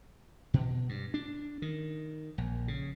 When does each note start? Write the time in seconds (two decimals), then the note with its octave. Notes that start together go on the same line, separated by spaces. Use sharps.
0.54 B2
0.89 G2
1.14 D4
1.62 D#3
2.38 A#1
2.68 C#3